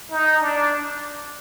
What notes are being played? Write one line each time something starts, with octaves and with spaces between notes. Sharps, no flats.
D#4
D4